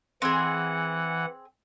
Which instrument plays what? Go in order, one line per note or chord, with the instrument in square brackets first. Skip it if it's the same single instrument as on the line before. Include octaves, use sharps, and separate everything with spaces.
[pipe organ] E3 F#5 [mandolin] C4 G#4